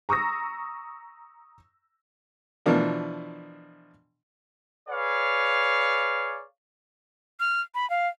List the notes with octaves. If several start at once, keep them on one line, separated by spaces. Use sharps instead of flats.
A#5 C#6 D#6 E6 A#6
B2 E3 F3 D4 A#4
G#4 B4 C#5 D5 F5
F6
B5
F5